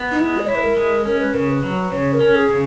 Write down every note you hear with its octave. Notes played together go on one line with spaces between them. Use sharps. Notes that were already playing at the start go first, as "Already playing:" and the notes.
Already playing: B3
D#4
G#3 E4
D#5
E4 C#5
B4
A#4
G#3
C#4 A#4
B4
C#3 A#4
B4
F#3
C#3 C#5
A#4
C#4
G#4
C#3